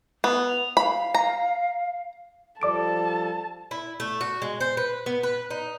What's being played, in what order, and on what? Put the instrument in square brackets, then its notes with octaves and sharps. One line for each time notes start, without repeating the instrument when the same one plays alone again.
[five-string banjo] B3
[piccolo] F7
[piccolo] F5 [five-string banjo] B5
[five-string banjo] A#5
[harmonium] F3 G3 A4 [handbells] D5 D6 D7 [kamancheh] A5
[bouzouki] E4
A3
F#4
G#3
C5
B4
B3
B4
D#4